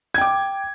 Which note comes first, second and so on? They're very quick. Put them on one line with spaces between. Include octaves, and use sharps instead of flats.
G#6 G5 D6